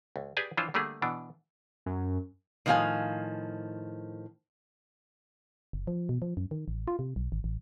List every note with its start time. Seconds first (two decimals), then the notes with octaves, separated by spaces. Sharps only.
0.16 C#2
0.37 G4 G#4 B4 D5 G5 G#5
0.57 E3 F3 D4 F4 C5 C#5
0.74 D3 G3 A3 A#3 G#4
1.02 B2 E3 D4
1.86 F#2
2.66 A2 D#3 F3 C#4 F5 G#5
5.73 F#1
5.87 F3
6.09 B2
6.22 F3
6.37 F#2
6.51 D#3
6.68 A1
6.88 F4
6.99 C3
7.16 B1
7.32 G#1
7.44 A1